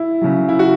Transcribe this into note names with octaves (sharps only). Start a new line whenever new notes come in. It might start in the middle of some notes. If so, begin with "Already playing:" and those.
Already playing: E4
C#3 F#3
E4
F#4